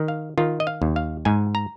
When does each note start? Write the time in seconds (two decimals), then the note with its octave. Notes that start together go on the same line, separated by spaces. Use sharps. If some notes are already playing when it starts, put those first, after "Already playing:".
Already playing: D#3
0.08 F5
0.38 D#3 F4
0.60 D#5
0.67 F5
0.82 D#2
0.96 F5
1.25 G#2 G#5
1.55 A#5